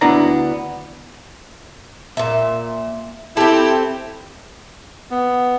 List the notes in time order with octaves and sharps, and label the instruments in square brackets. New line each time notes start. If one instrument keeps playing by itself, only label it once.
[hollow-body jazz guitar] D2 B3 D4 E4 D5 A#5
[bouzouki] A#2 E5
[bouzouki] C4 A4 [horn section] E4 G4
[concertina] B3